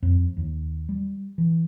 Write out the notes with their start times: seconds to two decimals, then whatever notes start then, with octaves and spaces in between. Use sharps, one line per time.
0.02 F2
0.37 D#2
0.89 G3
1.38 E3